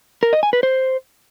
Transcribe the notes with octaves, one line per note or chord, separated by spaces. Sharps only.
A#4
D#5
G#5
B4
C5